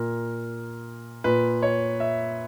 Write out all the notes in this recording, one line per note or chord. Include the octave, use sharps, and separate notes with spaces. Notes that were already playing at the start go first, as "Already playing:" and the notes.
Already playing: A#2 A#4
A#2 B4
C#5
E5